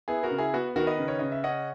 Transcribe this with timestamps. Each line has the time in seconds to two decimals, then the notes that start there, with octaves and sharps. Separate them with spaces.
0.08 B3 E4 G#4
0.23 F#4 A#4
0.31 C#3
0.38 E4 G#4
0.54 B3 F#4
0.76 D#3 F#4 A#4
0.87 B4 D#5
0.98 C#3
1.08 C#5
1.19 C#3 D#5
1.32 E5
1.44 C#4 D#5 F#5